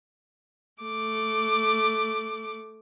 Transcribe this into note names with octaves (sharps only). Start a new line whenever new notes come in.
A3 D6